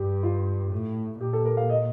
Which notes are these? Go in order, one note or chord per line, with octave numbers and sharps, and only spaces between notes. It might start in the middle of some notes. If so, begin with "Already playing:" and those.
Already playing: G2 G4
F4
A2
A#2 G4
A4
A#4
F5
D#5